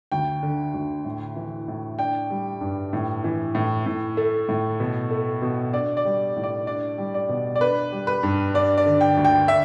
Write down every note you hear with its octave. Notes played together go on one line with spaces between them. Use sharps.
D2 G5
D3
D2
A2
E3
A2
D4 G5
G3
G2
A2
E3
A2
A2
A3
A2
B2
A3
B2
D4 D5
D5
G3
A2
D5
D4 D5
G3
D5
B2
D5
D4 B4
G3
B4
G2
D4 D5
D5
D3
G5
D2
G5
D4 E5